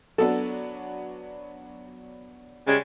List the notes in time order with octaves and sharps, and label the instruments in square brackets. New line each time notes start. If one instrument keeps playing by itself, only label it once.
[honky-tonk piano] F#3 B3 D4 [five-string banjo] A4
[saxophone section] C#3 G3 G#3